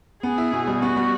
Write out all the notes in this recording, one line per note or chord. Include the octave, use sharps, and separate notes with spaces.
B3 G#4
E4
B2
G3
B3 F#4
G3